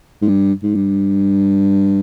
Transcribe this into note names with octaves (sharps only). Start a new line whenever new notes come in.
G#2
G2
G#2
G2